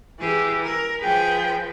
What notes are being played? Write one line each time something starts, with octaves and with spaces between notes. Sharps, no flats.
E3 G4 G#4
A#4
F3 G#4 B4 G5